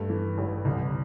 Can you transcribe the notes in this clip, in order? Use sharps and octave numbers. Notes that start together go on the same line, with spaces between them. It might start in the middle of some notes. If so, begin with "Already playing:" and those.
Already playing: G2 A3
E3
A1
C2